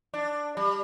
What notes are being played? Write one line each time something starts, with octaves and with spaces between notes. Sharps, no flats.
D4
G3